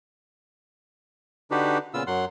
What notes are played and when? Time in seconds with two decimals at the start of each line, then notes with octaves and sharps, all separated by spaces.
1.51 D3 D4 D#4 F#4 G4 B4
1.94 A#2 C#3 B3 F4 E6
2.07 F#2 F#3 F#5 C6